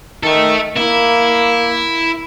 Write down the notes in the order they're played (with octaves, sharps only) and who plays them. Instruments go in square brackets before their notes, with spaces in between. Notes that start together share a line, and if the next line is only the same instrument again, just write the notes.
[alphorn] D#3 [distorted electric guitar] A4 E5
[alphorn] A#3 [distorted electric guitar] E4